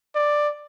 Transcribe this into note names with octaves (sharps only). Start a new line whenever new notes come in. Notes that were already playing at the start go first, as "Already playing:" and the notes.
D5